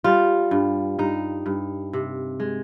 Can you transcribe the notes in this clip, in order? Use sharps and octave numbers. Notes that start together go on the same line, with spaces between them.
G3 F4
G2
G2 D#4
G2
C3
G#3